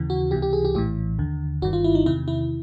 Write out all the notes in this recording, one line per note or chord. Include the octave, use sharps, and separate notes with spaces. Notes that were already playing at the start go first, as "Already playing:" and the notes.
Already playing: D#2 C#3 E3
F#4
C#2 C3 E3 G4
G4
G#4
G4
A#1 A2 E3 G4
D#2 D3
G1 G2 D#3 F#4
F4
E4
D#4
E2 C3 D#3 E4
E4